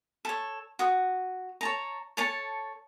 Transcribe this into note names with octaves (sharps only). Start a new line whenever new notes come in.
A4 C#5
F#4 D#6
C#5 A5 A#5
A4 C#5 A5